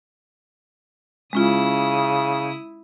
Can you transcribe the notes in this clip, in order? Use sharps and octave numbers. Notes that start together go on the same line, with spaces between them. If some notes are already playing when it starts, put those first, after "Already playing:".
C#3 G#3 C#4 E4 F4 D#6